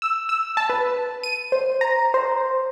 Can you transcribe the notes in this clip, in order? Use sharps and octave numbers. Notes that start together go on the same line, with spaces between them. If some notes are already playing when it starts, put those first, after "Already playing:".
E6
E6
A5
B4
D#7
C5
A#5
C5